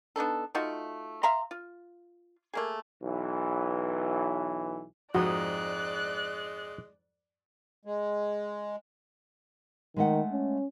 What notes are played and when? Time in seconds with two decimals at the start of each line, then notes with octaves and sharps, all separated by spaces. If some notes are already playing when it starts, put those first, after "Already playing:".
0.16 B3 D4 D#4 A4
0.55 A3 D#4 F4 F#4
1.23 E5 F5 A#5 C6
1.51 F4
2.54 A3 A#3 G#4
3.02 B1 E3
5.15 F2 G#2 G#3 F#4 D5 D#6 F#6
7.85 G#3
9.97 D#3 G#3 A3 F#5
10.32 C#4